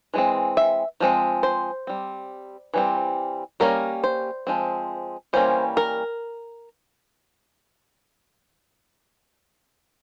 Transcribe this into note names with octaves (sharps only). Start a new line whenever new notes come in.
E3 G#3 C4
E5
F3 G#3 C4
C5
G3 C4
E3 G3 C4
G3 A#3 C#4 A#4
C5
F3 G#3 C4
E3 G3 A#3 C#4 C5
A#4